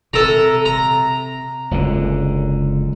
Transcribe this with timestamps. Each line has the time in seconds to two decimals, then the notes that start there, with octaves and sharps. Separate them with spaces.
0.13 C3 A4 A#5
0.65 A#5
1.71 F#1 C#2 D3